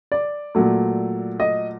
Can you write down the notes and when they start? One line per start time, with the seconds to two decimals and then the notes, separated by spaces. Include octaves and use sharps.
0.12 D5
0.55 A#2 F#3 A3
1.40 D#5